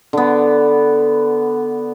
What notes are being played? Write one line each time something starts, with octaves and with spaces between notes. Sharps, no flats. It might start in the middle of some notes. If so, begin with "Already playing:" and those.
D3 B3